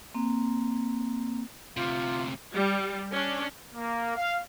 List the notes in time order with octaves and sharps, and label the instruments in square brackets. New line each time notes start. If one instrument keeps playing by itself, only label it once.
[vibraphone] A#3 C4
[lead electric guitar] D2 C3 [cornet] F4
[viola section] G3
C#4 D4
[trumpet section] A#3
F5